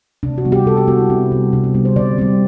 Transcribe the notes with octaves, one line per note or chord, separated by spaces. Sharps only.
C3 D4
F#4
G3 B3
G4
C3 A4
G4
G3 B3 F#4
E4
C3 C4
G3 B3
C3 D4
C4
G3 B3 D4
C5
D3 D5
G3 C4